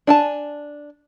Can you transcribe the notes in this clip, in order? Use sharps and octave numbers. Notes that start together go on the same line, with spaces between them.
D4 G#5 A5